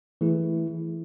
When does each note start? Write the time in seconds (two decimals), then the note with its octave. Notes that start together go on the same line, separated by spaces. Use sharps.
0.21 E3 A3 E4 G#4